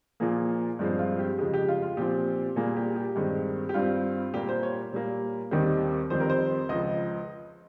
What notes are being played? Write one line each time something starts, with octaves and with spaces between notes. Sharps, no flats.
A#2 F3 A#3 G#4
G2 F3 G#3 C4
F4
G4
F2 C#3 G#3 G4
G4
F4
F4
A#2 F3 C4 G4
A#2 G3 A#3 G#4
G4
G4
G2 D#3 G#3 C4
G4
G2 G3 C4 F4
A#2 G3 A#3 G4
C5
C#5
A#2 G3 A#3
D#2 D#3 G3 C4
F2 D#3 G3 C4 C5
A#4
C5
C#2 C#3 F3 D#5